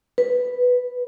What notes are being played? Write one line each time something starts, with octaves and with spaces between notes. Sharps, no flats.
B4